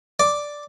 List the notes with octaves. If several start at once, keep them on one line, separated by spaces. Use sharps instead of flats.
D5